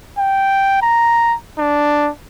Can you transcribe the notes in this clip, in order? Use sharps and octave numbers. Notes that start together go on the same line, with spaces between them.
G5
A#5
D4